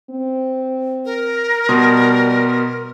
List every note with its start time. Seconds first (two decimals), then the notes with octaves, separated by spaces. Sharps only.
0.10 C4
1.05 A#4
1.69 B2 G3 C6 D#6